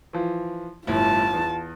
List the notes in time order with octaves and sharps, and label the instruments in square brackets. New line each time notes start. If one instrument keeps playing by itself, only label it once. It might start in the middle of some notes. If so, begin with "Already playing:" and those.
[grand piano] E3 F3
[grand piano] G1 A2 E4 [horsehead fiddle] F4 A5
[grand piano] E2